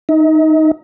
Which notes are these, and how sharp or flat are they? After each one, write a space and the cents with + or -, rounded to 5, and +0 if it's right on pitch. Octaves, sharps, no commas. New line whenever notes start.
D#4 +0 D#5 +40